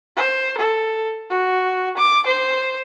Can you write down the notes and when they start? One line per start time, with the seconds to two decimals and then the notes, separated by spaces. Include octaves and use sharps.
0.17 C5
0.57 A4
1.30 F#4
1.97 D6
2.26 C5